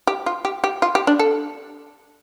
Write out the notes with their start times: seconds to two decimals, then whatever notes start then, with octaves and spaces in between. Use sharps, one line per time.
0.07 G4
0.26 F4
0.45 G4
0.64 G4
0.82 F4
0.95 G4
1.07 D4
1.19 A4